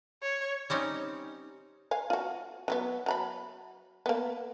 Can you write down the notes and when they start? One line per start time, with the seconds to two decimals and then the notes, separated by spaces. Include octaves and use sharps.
0.22 C#5
0.70 G3 C4 C#4 D#4
1.91 F5 G#5
2.10 F4 F#4
2.68 F#3 G3 B3
3.06 F#3 A#5 B5
4.06 A#3 B3